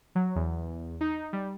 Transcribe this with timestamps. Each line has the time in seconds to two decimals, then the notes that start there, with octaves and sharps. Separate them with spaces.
0.15 F#3
0.36 E2
1.01 D#4
1.33 G3